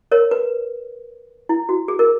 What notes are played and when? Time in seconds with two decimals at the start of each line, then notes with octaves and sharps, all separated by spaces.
0.12 A#4 C#5
0.31 B4
1.49 E4
1.69 F#4
1.88 G#4
1.99 A#4